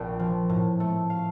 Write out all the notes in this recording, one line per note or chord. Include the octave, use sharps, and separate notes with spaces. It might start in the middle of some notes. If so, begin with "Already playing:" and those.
Already playing: A#1 G5
F3
A2
A3
F5